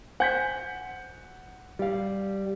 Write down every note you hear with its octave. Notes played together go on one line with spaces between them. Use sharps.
C5 F#5 G#5 G6 B6
G3 F5